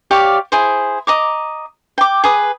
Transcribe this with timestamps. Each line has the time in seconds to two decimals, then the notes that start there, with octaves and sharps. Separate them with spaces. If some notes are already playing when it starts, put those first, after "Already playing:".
0.11 G4 C#5 D5 F5
0.52 E4 G#4 C5
1.07 D#5 A#5 D6
1.98 G5 D6
2.24 G#4 B4 D#6